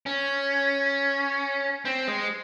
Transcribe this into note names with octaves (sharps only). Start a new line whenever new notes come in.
C#4
C4
G#3